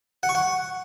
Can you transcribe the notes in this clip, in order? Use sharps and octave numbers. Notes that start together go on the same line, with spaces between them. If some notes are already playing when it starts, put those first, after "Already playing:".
F#5
C#6
F#5